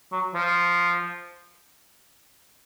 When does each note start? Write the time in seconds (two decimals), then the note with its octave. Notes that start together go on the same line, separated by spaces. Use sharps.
0.12 F#3
0.34 F3